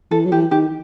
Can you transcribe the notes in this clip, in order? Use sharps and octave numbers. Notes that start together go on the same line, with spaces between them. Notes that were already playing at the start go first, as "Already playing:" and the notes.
E3 A4
F#3
E3 G4
D#3 G4